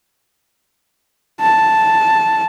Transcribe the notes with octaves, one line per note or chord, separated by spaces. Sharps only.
A5